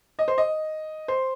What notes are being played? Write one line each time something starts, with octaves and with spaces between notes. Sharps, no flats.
D#5
C5
D#5
C5